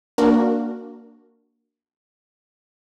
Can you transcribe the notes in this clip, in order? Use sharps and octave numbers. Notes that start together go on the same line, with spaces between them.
A#3 D4 F#4 A#4